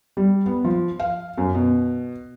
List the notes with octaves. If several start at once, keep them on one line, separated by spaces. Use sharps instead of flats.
G3
B3
F3
F5
F#2
B2